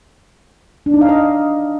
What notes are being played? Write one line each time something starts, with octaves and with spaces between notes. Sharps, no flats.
D4
D#4
F5
D#5